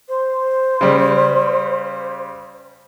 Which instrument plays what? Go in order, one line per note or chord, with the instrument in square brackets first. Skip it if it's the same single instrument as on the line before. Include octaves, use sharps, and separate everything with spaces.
[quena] C5
[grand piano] C#3 G3